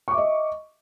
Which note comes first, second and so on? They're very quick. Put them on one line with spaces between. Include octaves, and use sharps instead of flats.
C#6 D6 E5 D#5